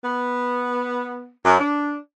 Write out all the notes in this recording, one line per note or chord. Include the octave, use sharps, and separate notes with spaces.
B3
F#2
D4